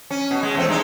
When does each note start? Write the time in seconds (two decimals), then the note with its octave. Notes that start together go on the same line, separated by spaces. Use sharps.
0.11 C#4
0.31 B2
0.43 G#3
0.55 E2 A3 C4
0.69 G2 G#3 D#4